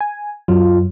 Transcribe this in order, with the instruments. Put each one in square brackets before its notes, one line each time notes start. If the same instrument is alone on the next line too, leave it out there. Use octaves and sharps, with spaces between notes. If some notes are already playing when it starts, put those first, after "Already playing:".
[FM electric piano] G#5
[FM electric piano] F#2 F#3 [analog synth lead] F4